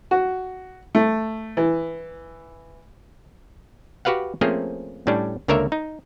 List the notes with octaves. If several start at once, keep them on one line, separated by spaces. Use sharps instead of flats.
F#4
A3
E3
F#4 G4 B4 F5 F#5
F3 A3 A#3 C4 C#4 G#4
A2 G3 C#4 D4
C#2 D3 A#3 A#4 C#5 E5
D#4